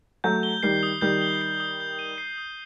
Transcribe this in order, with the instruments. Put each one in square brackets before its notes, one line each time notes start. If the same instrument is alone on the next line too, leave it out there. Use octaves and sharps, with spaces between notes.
[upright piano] F#3 A3 [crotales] G6
[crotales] G7
[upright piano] D#3 G3 [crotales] C7
[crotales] D#6
[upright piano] D#3 G3 [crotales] G6
[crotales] G7
C7
D#6
G6
D#7
C7
D#6